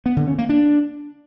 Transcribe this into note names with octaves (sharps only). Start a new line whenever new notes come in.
B3
D3
C#4
A#3
D4